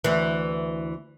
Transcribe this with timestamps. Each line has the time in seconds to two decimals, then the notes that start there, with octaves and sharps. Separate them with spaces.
0.04 D2 E3